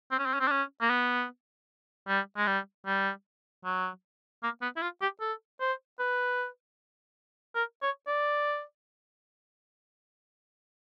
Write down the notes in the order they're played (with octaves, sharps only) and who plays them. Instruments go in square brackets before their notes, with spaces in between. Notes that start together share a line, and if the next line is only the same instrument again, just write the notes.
[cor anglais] C4
C#4
C4
C#4
C4
D4
C#4
A#3
B3
G3
G#3
G3
G3
F#3
A#3
B3
E4
F4
G4
A4
C5
B4
A#4
C#5
D5